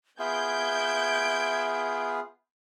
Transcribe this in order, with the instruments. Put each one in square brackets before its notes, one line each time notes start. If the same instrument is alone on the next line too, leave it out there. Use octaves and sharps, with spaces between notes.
[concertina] B3 F4 G#4 [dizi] E5 [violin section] G6 G#6 D7